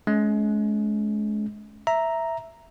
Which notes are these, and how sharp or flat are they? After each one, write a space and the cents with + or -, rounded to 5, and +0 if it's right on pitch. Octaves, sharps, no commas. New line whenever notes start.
G#3 +35 C#4 +20
E5 +0 A#5 +0